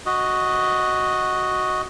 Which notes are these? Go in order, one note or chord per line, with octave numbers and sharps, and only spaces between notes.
F#4 D#5